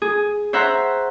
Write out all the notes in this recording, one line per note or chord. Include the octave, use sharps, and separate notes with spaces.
G#4
C5 C#5 E5 F#5 A#5